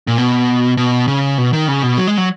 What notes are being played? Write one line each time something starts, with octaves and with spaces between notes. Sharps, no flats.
A#2
B2
B2
C#3
B2
D#3
C#3
B2
F#3
G#3
F#3